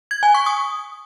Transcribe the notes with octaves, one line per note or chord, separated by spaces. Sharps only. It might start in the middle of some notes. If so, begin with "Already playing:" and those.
G#6
G#5
C#6
D#6